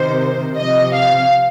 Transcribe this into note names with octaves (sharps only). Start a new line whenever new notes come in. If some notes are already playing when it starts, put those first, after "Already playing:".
Already playing: C3 D#3 C5
C3 F3 D#5
F5